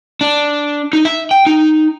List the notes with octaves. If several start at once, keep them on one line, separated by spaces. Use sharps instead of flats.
D4
D#4
E5
G5
D#4